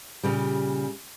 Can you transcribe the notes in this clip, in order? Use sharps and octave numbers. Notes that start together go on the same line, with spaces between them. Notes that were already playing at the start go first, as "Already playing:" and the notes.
A#2 C#3 G3